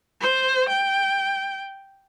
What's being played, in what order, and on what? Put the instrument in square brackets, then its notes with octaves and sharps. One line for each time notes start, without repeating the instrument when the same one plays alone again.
[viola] C5
G5